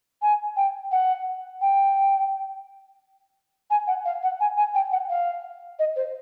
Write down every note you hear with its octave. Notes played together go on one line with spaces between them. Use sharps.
G#5
G5
F#5
G5
G#5
F#5
F5
F#5
G#5
G#5
G5
F#5
F5
D#5
C5